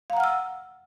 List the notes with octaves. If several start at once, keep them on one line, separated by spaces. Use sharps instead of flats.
F5 F#5 A#5 E6 F6